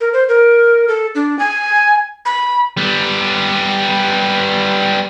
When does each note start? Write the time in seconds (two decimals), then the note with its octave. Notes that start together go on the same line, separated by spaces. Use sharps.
0.01 A#4
0.13 C5
0.29 A#4
0.88 A4
1.15 D4
1.39 G#5
2.25 B5
2.77 G3 B3